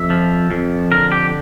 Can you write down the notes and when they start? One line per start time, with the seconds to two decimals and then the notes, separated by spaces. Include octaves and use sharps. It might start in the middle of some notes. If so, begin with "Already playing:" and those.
Already playing: F2 E5
0.10 F3
0.51 F2
0.92 D3 A#4
1.12 G4